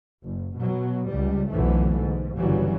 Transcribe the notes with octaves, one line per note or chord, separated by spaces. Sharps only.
F#1
B2 F#3
C#2 G3
B1 F2 D3 E3 A3
G#2
G1 F#2 C#3 E3 F#3 G3